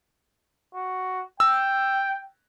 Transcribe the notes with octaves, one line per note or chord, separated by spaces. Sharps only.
F#4
G5 E6